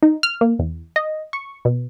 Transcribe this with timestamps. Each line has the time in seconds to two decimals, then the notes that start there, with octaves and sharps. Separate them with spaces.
0.03 D#4
0.23 F6
0.41 A#3
0.59 E2
0.96 D#5
1.33 C#6
1.65 B2